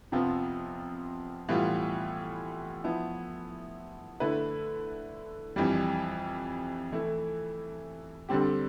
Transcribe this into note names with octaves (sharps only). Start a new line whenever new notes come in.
F2 C3 F3 B3 F4
A2 E3 G3 B3 F4
F3 B3 E4
D3 A3 E4 B4
F2 E3 G3
E3 A3 E4
D3 G3 C4 G4